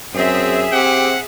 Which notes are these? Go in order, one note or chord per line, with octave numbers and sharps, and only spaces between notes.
F#2 C4 G#4 E5
C4 G4 F#5